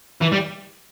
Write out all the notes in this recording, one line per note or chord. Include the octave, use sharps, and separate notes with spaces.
E3
G3